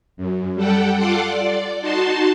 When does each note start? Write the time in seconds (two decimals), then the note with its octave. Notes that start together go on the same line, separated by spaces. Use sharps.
0.17 F#2
0.55 G3 A4 F#5 G5
0.97 F4 A4 F#5 C6 D6
1.30 D5
1.81 D#4 F#4 A5 C6